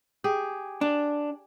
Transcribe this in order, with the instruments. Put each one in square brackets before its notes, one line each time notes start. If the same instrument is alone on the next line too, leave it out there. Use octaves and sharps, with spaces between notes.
[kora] G4 G#4
[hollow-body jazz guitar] D4